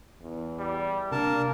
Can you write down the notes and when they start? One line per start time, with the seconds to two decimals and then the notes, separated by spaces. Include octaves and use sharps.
0.21 E2
0.59 G3
1.12 C3 A#3 D4 A#4 F5 A5